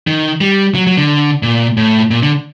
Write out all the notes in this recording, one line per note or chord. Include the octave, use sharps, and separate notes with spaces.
D#3
G3
F#3
F#3
D3
A#2
A2
A#2
D3